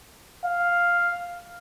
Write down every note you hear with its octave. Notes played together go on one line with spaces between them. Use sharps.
F5